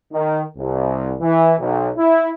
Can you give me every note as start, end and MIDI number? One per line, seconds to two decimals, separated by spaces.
0.13 0.42 51
0.57 1.15 36
1.21 1.54 52
1.59 1.90 35
1.97 2.30 64